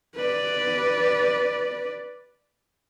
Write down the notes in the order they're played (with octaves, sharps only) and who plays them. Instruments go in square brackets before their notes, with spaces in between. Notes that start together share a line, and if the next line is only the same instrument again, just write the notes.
[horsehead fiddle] B4 D5